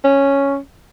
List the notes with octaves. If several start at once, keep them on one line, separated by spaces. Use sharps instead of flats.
C#4